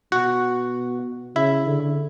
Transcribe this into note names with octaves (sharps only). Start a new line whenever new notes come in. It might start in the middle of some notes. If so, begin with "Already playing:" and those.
B2 F#4 F#5
C#3 E4 E5
D3